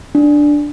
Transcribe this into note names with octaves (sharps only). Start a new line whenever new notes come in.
D4